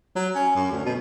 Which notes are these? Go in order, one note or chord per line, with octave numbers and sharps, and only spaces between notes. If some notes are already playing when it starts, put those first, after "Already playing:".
F#3
C#4
F#2
D2
B2